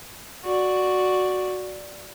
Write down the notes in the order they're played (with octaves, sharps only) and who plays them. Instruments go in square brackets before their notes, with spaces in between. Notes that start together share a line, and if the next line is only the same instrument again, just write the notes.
[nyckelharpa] F#4 D5